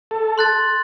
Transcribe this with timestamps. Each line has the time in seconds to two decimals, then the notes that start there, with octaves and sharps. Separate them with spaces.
0.11 A4
0.38 C6 F#6 A6